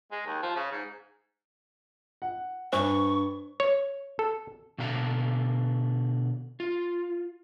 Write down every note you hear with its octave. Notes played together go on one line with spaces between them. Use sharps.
G#3
D#2
F3
C#3
G#2
F#5
G2 D4 C5 C#6
C#5
A4
B2 D3 D4 F5 A#5
F4